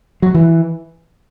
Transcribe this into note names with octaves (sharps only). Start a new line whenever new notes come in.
F#3
E3